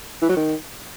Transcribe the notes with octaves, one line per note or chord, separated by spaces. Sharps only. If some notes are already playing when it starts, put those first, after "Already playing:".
E3
F#3
D#3